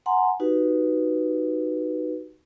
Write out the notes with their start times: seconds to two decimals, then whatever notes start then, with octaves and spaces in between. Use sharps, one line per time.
0.06 F#5 G#5 A#5 C6
0.40 D#4 F#4 G4 B4